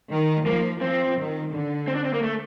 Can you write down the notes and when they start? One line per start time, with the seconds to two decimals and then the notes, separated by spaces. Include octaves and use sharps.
0.11 D#3
0.46 F3 A#3
0.81 F3 C4
1.17 D#3
1.52 D3
1.88 C4
1.95 D4
2.05 C4
2.13 A#3
2.23 A3